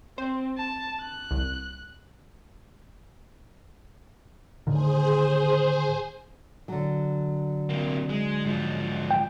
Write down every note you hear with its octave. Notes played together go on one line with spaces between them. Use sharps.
C4 C5
A5
F#6
C2
A2 D3 D#3 G#4 C5
D3 F#3
C3 A#3
G#3
G#2 F3
G5